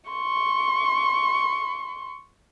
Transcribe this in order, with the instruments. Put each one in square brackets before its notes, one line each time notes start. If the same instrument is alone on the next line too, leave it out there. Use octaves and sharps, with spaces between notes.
[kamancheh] C6 C#6